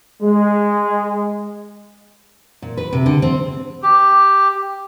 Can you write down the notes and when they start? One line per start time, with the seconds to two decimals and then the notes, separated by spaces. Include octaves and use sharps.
0.21 G#3
2.62 A#2
2.77 B4
2.93 C3
3.06 D3
3.22 C4
3.83 G4